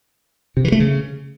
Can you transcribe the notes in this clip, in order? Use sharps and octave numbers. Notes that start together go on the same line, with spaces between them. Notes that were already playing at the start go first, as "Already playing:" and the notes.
C3
E3
A3
C#3